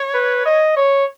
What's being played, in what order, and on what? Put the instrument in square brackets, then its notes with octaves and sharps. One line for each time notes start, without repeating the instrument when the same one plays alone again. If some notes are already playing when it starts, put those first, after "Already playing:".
Already playing: [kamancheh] C#5
[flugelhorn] B4
D#5
C#5